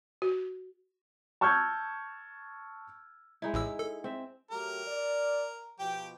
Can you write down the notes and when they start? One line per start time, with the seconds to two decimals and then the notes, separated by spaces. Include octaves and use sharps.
0.22 F#4
1.41 A5 C#6 E6 F6 G6 G#6
3.42 G#3 D#4 E4
3.54 A1 A2 E6
3.79 A4
4.04 C4 E5
4.51 F#3 A3 G4 A#4
4.87 D5
5.79 B2 F3 G4 G5